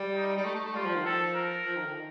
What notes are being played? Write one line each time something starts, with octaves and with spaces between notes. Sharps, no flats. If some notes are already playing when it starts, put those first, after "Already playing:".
Already playing: G3
D#4
G3
A3
A3
A3
G3 F4
F3
D#3
F3 A4
A#4
F3
D#3
D3
D#3